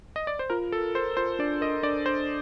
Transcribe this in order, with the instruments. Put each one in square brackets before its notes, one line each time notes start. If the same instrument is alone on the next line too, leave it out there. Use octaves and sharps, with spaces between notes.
[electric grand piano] D#5
D5
C5
[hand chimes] F4 [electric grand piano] A#4
[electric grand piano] A4 [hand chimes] A#4
[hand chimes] A#4 [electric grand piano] C5
[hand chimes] F4 [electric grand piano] C5
[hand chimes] D4 [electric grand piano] D5
[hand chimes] A#4 [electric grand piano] D#5
[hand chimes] D4 [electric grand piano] D5
[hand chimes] D4 [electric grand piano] C5